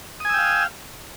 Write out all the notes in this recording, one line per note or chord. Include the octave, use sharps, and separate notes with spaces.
F5 G5 G#5 D#6 E6